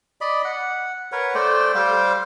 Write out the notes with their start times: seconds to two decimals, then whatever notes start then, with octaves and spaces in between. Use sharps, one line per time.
0.21 D5 D#5 B5
0.45 F#5
1.12 A#4 B4 C#5 F#5
1.35 A3 C5 D5 G5
1.75 G3 C5 F5 G5